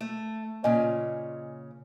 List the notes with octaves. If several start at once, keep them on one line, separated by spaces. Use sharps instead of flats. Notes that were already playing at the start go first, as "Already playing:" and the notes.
A3
A#2 C#3 C#5 D#5 G#5